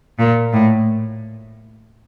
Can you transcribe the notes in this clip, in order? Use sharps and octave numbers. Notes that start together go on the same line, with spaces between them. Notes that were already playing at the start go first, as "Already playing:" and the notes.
A#2
A2